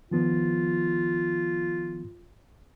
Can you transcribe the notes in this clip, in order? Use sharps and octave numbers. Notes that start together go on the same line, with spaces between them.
D#3 F3 B3 F4